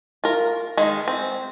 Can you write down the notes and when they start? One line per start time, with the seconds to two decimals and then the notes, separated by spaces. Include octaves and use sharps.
0.24 F4 A#4
0.77 D#3 G#3
1.08 C4